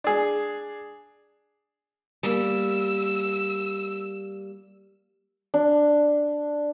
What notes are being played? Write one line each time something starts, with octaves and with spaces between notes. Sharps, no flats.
D4 G#4
G3 A#3 E6
D4